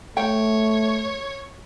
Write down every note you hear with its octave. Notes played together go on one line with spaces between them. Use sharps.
A3 C#5 G5